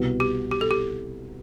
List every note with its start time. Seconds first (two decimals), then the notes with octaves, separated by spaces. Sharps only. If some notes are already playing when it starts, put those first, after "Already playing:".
Already playing: C2 B2 G3 B3
0.20 G4
0.51 G4
0.61 A4
0.71 G4